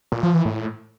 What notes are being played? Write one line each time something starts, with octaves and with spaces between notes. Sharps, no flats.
A#2
F3
E3
A2